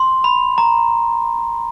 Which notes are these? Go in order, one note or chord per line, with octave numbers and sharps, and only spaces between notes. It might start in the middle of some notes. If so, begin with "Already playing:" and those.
Already playing: C6
B5
A#5